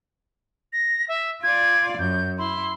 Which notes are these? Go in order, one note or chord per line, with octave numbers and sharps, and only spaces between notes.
A#6
E5
F4 D5 G#6
F#2 G6
E4 C6